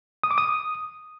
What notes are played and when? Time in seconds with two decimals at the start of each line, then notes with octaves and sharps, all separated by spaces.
0.24 D#6
0.31 D6
0.38 D#6